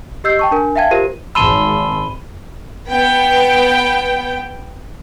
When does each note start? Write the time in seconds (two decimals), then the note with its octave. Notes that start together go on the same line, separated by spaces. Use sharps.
0.24 G4 D#5 E6 G6 C7
0.39 G5 A5 C#6
0.51 D4 A#4 G#5
0.76 E5 F5 G5 A5 G#6
0.91 F4 G4 A#4 C5 D#7
1.35 G#1 A5 B5 C6 E6 D#7 G7
2.91 B3 G5